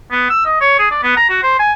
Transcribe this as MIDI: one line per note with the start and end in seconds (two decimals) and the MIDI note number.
0.11 0.28 59
0.30 0.42 88
0.45 0.59 75
0.61 0.75 73
0.79 0.87 68
0.91 1.00 74
1.03 1.13 59
1.17 1.29 82
1.29 1.38 66
1.43 1.59 72
1.59 1.72 80